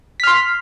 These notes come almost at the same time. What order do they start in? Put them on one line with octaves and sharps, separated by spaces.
B6 F6 C6